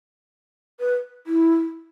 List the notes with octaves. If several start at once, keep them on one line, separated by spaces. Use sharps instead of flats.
B4
E4